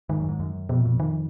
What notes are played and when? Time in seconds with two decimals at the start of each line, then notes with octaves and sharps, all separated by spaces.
0.09 G#2 D#3
0.20 F#2
0.29 G#2
0.40 F#2
0.69 F2 B2
0.79 A#2
0.85 F2 B2
1.00 D#3